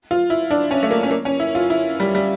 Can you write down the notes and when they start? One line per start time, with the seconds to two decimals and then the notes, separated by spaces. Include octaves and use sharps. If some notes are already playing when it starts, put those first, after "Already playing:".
0.11 F4
0.30 E4
0.50 D4
0.71 C#4
0.83 A3
0.91 A#3
1.03 C#4
1.11 A#3
1.25 C#4
1.40 E4
1.55 F4
1.70 E4
2.00 G3
2.15 G3